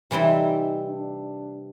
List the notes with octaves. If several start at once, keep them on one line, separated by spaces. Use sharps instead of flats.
C3 E3 G3 C4 D#4 E4
D4